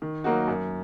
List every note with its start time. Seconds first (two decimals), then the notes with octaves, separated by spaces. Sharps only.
0.02 D#3
0.24 F#3 A#3 D#4 F#4
0.48 F#2